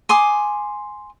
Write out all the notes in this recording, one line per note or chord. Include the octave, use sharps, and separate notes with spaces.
G#5 C6 D6 D#6